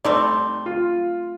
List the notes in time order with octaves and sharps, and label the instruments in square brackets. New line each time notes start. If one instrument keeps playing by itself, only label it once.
[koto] G3 A3 C4 [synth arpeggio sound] D#4 A4 D5
[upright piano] F4